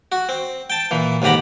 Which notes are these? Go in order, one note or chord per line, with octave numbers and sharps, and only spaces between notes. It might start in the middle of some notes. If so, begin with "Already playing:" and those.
F#4
C4
G5 A5
A#2 E3
D#2 G#2 D3 G4 A#5 B5